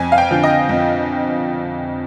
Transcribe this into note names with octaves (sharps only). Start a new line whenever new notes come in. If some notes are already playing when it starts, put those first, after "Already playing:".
Already playing: F2 G#5
F5
G5
D3 F3
D#5
F2